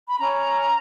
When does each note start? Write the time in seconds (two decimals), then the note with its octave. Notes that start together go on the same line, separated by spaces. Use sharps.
0.08 B5
0.19 C#4 A#5